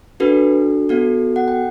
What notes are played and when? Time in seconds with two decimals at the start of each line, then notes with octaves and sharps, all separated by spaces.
0.20 D4 F#4 A4 B4
0.89 B3 F#4 A4
1.36 F#5
1.48 G5